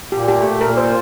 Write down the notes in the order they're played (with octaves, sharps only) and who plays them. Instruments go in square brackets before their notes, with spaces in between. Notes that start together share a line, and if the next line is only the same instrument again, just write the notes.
[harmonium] A#2 [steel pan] G4
[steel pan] G4
[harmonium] A3
[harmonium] A#2 [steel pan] A#4
[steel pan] C5
[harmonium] F4